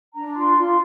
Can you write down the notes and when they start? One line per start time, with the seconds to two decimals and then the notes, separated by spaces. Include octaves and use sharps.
0.14 D4 A#5
0.36 F4 C6
0.57 F4